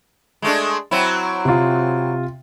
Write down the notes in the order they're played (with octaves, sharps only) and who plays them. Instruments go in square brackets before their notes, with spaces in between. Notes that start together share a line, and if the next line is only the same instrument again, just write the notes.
[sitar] G#3 A3 D4
F#3 C4 E4
[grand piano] C3 F4